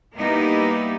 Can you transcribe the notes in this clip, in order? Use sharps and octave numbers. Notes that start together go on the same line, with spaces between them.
G3 A#3 B3 D#4 E4 G4